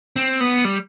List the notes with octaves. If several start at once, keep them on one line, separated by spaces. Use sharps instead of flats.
C4
B3
G3